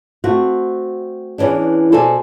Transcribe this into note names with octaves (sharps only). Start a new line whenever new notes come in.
A3 C4 F#4
E2 G#2 E3 C#4 D4
B2 A4 C5 D5 G#5